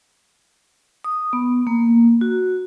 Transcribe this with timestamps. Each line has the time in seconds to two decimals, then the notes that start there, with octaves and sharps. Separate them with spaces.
1.04 D#6
1.33 B3
1.67 A#3
2.21 F#4